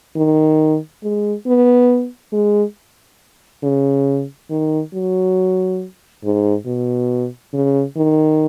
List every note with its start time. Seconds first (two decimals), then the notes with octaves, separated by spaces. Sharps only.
0.17 D#3
1.03 G#3
1.46 B3
2.33 G#3
3.63 C#3
4.50 D#3
4.94 F#3
6.24 G#2
6.66 B2
7.53 C#3
7.97 D#3